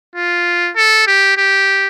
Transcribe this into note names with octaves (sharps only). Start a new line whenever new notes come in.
F4
A4
G4
G4